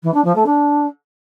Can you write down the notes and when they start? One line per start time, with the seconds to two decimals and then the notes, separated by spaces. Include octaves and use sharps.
0.03 E3
0.14 D4
0.24 F3
0.35 A3
0.46 D4